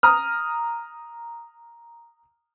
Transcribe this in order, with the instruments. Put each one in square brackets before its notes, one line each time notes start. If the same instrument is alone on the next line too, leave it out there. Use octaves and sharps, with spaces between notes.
[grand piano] A#5 D#6 F6